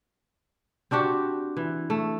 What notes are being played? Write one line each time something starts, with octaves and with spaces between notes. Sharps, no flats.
C4 D4 F#4 G4
E3
A3